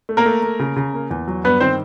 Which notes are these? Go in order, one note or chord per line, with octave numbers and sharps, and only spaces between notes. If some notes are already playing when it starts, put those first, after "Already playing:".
A3
A#3 A#4
A3
A#3
C#3
C#3
A#3
E2
F#3
G2 B3 B4
D#3 C4 C5